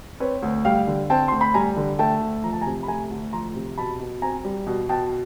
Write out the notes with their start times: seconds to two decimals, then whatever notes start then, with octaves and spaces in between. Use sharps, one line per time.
0.20 C4 B4 C#5
0.43 D2
0.65 G3 F5 G5
0.87 D3
1.10 C4 G5 A5
1.28 D2 C6
1.41 B5
1.54 G3 G#5 A#5
1.77 D3
1.99 A3 G5 A5
2.21 D2
2.43 F3 A#5
2.53 A5
2.61 G#5 A#5
2.66 C3
2.83 B5
2.88 A3 G#5 A#5
3.11 D2
3.33 F3 A#5 C6
3.55 C3
3.78 B2 A5 B5
4.00 B2
4.22 C4 G#5 A#5
4.45 G3
4.67 B2
4.89 B2 G5 A5